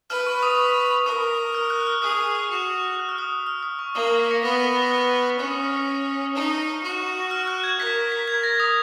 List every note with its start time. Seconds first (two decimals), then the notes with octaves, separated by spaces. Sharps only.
0.10 B4 F6
0.26 C#6
0.43 D#6
0.58 C#6
1.06 A#4 D#6
1.55 F6
1.70 F#6
1.87 F6
2.02 G#4 D#6
2.50 F#4
2.99 F#6
3.09 F6
3.18 D#6
3.28 F6
3.47 F6
3.63 D#6
3.79 C#6
3.95 A#3 D#6
4.07 F6
4.19 B6
4.31 A#6 C#7
4.43 B3 B6
4.55 A#6
4.67 B6
4.79 A#6
4.91 F#6
5.06 A#6
5.39 C#4 C#6
5.51 D#6
5.63 F6
6.35 D#4
6.83 F#4
7.31 F6
7.48 F#6
7.64 G#6
7.79 A#4 B6
8.12 B6
8.28 G#6
8.43 A#6
8.60 D#6